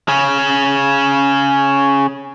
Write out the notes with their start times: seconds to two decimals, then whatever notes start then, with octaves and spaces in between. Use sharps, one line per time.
0.08 C#3 C#4